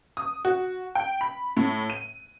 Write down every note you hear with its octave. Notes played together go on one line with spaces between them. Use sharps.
D#6
F#4
G5
B5
A2
D#7